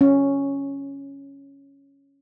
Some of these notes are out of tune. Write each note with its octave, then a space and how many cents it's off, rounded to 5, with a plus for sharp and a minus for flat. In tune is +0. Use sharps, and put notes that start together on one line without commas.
C#4 +0